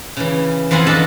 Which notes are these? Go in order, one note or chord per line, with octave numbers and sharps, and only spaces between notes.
C#3 E3
F2 E3 F4 B4 F#5 G#5
D4 A4 D#5 E5 A5